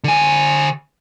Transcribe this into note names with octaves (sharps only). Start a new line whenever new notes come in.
D3 G#5